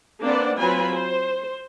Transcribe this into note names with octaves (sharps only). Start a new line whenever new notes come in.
A#3 C4 D4 B4 D5 F#5
F#3 C4 F4 B4 G#5 B5
C5